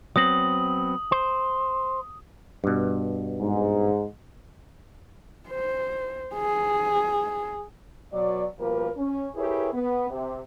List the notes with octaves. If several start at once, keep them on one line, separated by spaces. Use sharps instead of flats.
F#3 B3 C4 D#6 F#7
C5
G2 B2
G#2
C5
G#4
B2 F#3 D5
B2 F3 G3 A#3 A#4 B4
C#4
E4 G4 G#4 A#4 B4 C#5
B3
C3